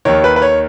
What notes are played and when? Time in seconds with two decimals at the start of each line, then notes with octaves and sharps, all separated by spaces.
0.05 D#2 D#3 C#5
0.24 B4
0.36 B4
0.42 C#5